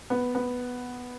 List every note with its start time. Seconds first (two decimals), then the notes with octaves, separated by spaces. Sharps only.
0.10 B3
0.35 B3